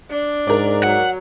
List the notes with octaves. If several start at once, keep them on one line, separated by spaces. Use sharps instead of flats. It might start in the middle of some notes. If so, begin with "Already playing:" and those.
D4
G#2 A#4 D5
F#3 F#5